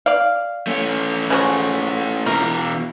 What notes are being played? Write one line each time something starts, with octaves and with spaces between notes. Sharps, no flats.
D5 F5
A3 C#4
C#3 F3 F#4
B2 E3 F4 A#4